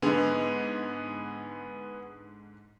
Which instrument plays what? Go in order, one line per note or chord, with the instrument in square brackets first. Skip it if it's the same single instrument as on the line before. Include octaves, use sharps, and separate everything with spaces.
[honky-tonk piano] G#2 D3 [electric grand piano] B3 G#4